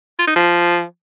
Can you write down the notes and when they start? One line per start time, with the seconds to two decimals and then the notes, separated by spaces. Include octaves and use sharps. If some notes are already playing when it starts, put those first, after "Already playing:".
0.19 F4
0.27 D#4
0.35 F3